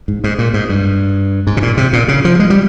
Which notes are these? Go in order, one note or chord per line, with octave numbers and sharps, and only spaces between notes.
G#2
G#2
A#2
G#2
G2
G#2
C3
A#2
C3
A#2
C#3
F3
G#3
G3